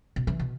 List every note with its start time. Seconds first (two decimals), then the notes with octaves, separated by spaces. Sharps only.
0.16 B2
0.27 E3
0.40 B2